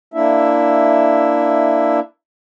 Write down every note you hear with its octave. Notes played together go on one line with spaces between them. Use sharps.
A#3 D4 E4 E5